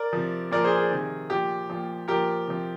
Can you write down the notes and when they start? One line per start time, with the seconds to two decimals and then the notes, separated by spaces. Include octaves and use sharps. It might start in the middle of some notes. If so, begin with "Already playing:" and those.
Already playing: A#4 D5
0.13 C3 F3
0.51 A#2 F3 A#4 D5
0.64 G#4 C5
0.77 G#4
0.91 C3 D#3
1.30 A#2 F3 G4
1.70 A#2 F3
2.08 A#2 F3 G4 A#4
2.47 C3 F3